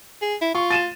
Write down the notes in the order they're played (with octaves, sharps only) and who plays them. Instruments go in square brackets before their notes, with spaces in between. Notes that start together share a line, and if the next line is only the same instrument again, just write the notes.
[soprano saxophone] G#4
E4
[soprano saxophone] F4 [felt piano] C#6
[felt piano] A6 D#7 E7